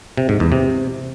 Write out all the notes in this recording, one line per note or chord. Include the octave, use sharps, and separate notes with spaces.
C3
G#2
E2
C3